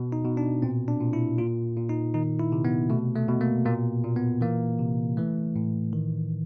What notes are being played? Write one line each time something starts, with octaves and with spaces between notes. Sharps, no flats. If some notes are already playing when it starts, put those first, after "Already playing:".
Already playing: B2
D#4
B2
D4
A#2 C4
D4
A#2
E4
A#2 F4
A#2
D#4
D#3 D#4
E4
C3
B3
B2 A3
A3
B2
A#3
A#2 A#3
A#2
B3
E3 A#3
C3
E3 A3
A2
D#3